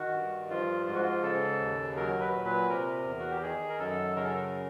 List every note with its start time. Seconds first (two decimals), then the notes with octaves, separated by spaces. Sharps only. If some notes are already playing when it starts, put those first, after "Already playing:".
Already playing: D#3 F#4
0.14 G2
0.50 F3 F4
0.86 G#2 F4
0.95 F#4
1.03 F4
1.23 C#3 A4
1.59 D#2
1.96 F#3 A#4
2.21 B4
2.33 A#2
2.45 B4
2.69 C3 A#4
3.06 E2
3.19 F#4
3.31 G4
3.43 D#3 G#4
3.69 A#4
3.79 F#2 A4
4.16 C#3 A#4
4.25 A4
4.34 A#4